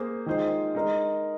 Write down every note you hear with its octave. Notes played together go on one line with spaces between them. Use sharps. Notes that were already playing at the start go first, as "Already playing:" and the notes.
Already playing: A#3 G#4 C5
D#3 G#3 F4 G#4 C5
G#3 D#4 A#4